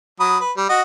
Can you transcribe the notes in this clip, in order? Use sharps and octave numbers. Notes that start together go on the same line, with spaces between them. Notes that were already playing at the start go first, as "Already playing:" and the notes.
F#3 B5 D#6
B4
G3
F#4 D#5